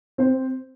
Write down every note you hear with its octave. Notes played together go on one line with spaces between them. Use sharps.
C4 C5